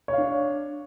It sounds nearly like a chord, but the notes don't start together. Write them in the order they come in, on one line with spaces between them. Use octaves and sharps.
C#5 F5 D4